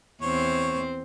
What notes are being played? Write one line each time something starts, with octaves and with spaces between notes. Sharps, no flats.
E2 C4 C5 C#5